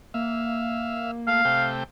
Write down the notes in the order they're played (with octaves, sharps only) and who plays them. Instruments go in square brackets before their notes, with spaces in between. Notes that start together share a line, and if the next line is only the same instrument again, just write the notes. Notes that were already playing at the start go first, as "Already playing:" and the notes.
[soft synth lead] A#3 [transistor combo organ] E5 F5
[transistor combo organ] A3 [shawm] F5
[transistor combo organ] C3 A3 G5